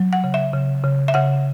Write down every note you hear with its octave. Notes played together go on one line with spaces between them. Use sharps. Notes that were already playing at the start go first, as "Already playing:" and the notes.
Already playing: F#3
F#5
C#3
E5
C#3
C#3
E5
C#3 F#5